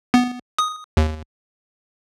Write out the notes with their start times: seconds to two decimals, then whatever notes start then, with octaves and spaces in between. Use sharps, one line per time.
0.14 B3
0.58 D#6
0.97 D#2